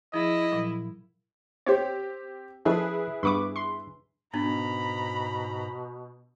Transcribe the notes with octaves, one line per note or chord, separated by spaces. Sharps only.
F3 E4 G#4 D#5
A#2 F3 F#3
C4 G4 C5 C#5
F3 C#4 E4 G#4 A4 B4
G2 B3 B5 C#6 D6
C6
G#2 B2 B3 D4 A#5 B5